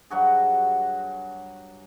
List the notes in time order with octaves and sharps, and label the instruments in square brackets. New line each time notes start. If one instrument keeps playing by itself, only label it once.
[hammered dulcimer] G2 F#3 F#4 G#4